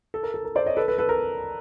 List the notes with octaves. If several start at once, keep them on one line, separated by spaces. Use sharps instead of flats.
A4
A#4
A4
A#4
C5 D5
C#5 D#5
A4 B4
A4 B4
A4 B4
A#4